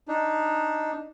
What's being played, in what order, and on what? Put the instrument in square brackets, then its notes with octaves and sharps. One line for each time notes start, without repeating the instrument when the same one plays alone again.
[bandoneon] D4 D#4